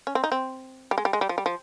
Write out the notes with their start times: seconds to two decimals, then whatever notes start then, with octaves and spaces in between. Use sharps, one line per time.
0.07 C#4
0.15 C4
0.24 D#4
0.32 C4
0.91 G3
0.98 G#3
1.05 G3
1.13 G#3
1.21 G3
1.29 F3
1.38 G3
1.46 F3